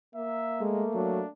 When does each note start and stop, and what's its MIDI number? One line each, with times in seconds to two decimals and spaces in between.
0.16 1.26 58
0.16 0.65 76
0.61 0.86 56
0.61 1.26 57
0.94 1.21 54
0.94 1.30 62